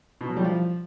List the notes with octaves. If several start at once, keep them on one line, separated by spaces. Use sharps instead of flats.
B2
F#3
G3
F3